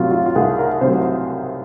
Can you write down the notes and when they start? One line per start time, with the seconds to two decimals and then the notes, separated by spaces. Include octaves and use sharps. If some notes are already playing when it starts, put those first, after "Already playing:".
Already playing: C2 C3 F#3 F4
0.11 F4
0.18 F#4
0.26 F4
0.36 C2 G#4
0.58 A#4
0.81 C3 F#3 C5